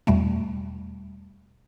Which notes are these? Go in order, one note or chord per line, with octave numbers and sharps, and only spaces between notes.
E2 B2 G3 A3